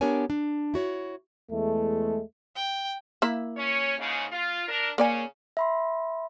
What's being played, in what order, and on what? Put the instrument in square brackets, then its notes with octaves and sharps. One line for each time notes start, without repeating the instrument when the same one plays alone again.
[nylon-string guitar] B3 D4 G4 A#4 C#5 G#5
D4
E4 F#4 C#5
[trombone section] E2 G#3 A3
[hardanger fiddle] G5
[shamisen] A#3 E4 E5
[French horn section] C#4 C#5
G#2 C#3
F4
D4 A#4
[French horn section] C#3 C#4 [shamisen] A#3 D5 G#5
[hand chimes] E5 B5 C6